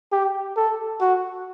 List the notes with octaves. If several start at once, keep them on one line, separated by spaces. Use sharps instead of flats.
G4
A4
F#4